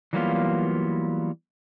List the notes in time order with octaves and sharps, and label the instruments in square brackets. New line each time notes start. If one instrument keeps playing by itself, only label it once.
[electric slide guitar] E3 F#3 G3 A#3 B3 F4